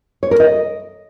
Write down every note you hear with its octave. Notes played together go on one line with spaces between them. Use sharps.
C#5
A#4
D#5